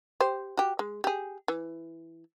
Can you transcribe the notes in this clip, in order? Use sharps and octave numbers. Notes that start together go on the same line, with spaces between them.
G4 C5
F#4 G4
G#3
G4 G#4
E3